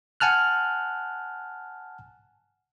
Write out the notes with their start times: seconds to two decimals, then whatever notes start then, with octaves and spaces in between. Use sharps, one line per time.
0.20 F#5 G#5 A5 F6 F#6